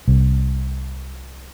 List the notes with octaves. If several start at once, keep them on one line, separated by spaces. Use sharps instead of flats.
C2